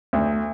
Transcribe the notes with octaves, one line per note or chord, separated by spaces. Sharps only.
D2